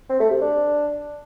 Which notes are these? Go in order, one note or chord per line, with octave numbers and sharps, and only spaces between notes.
C4
A3
C3
D4